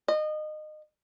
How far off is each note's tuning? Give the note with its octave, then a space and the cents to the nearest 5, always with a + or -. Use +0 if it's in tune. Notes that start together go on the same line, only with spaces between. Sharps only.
D#5 -25